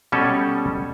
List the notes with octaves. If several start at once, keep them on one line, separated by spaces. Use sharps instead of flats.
B2 G3 C#4 A4